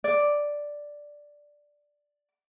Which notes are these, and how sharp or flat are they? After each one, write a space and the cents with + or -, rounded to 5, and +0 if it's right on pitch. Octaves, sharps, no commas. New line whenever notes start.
D5 +0